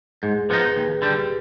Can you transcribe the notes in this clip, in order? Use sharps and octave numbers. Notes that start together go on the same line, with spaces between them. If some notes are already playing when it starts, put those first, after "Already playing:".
G#2 G#4
G#4
F3 B3 D#4 B4
D#2
D3 G3 G4